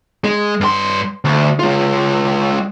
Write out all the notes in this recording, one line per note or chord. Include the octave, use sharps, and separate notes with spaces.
G#3
G2 C6
D2
G#3 F4